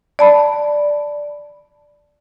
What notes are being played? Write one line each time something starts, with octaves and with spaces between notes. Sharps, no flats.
D5 A5 B5